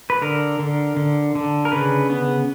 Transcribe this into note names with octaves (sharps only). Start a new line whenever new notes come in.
B4
D3 A#4
D3
D3
D3
A#4
C#3 B4
B3